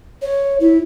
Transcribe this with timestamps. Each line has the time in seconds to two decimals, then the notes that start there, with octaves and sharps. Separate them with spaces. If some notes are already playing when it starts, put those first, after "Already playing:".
0.22 C#5
0.60 E4